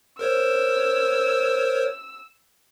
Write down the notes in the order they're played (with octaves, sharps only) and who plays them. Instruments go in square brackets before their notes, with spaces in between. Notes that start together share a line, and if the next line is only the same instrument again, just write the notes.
[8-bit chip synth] A#4 C5 C#5 [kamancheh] E6